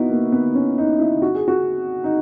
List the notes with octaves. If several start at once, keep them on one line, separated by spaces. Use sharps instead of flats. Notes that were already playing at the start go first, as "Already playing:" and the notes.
Already playing: B3 D#4 E4 F#4
A#3
B3
C#4
D#4
E4
F#4
G#4
F#4
D#4